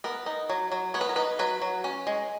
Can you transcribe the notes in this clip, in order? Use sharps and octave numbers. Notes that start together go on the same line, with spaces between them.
B3 A#4
D#4
F#3
F#3
B3 C#5
B4
A#4
D#4 B4
F#3 B4
F#3
C#4
G#3